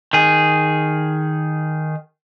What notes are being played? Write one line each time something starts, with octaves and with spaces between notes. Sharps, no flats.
D#3 G#4